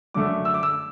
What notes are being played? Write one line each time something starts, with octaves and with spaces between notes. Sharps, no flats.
F#2 D3 A3 D6
E6
D6
E6